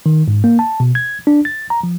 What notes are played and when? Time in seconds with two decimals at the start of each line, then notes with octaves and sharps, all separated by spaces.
0.06 D#3
0.28 G#2
0.44 A#3
0.59 A5
0.80 B2
0.95 G#6
1.27 D4
1.45 A6
1.70 A#5
1.83 F3